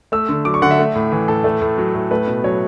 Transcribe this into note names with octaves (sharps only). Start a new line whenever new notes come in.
A3 E6
D3
F#3 D6
C#6
D3 F#5
E5
A3
A2
E3
A2 A4
A3
A2
F#3
A2
A3 B4
B2
F#3 C#5